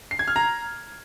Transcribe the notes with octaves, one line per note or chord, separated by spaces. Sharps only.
C7
G#6
F6
A#5